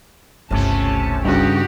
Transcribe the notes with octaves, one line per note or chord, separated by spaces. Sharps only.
G1 C#2 C3 A3 C#4 A5
G2 C#3 D#4 F#4 G4